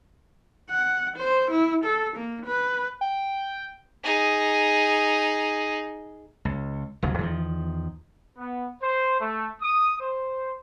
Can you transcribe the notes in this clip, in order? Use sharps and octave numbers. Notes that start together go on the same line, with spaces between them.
F#5
C5
E4
A4
A#3
B4
G5
D#4 G#4
C#2
F1 D2 C#3 F#3
E2 D#3 F3
B3
C5
A3
D#6
C5